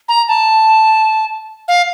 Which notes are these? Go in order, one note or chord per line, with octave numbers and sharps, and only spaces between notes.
A#5
A5
F5